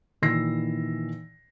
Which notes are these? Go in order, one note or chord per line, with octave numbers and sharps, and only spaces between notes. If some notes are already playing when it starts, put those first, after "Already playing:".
A#2 D#3 E3 E6 A#6 C7